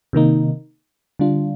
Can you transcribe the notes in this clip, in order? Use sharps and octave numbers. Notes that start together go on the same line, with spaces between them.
C3 D#3 A#3 D#4
D3 G3 D4 F4